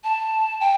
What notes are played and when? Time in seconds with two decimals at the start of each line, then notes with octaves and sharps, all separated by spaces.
0.04 A5
0.60 G5